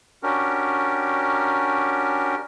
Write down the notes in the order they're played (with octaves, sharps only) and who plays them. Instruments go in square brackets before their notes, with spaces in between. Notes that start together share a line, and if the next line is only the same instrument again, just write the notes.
[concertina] C#4 D4 F#4 G4 A#4